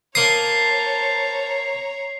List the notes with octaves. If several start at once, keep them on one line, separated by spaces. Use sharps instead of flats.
A#3 C5 C#5 A5 A#5 D#6 C7